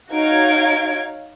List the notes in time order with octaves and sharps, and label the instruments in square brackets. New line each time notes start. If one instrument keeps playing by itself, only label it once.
[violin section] D#4 F#4 C#5 F5 G#6 D7